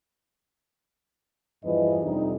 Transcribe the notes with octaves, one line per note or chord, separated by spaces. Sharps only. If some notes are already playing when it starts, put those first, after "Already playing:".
E2 G2 E3 F3 B4 D#5
F2 C3 G3 D4 D#4